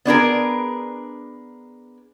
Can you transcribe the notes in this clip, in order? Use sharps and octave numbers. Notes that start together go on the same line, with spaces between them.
B3 D4 G#4 A#4